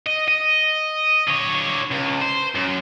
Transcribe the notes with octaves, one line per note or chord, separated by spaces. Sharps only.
D#5
D#5
D3 C#5
C#2
C5
F#2